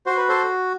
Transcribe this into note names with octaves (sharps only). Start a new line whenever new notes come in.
F#4 C5
B4
A4 C5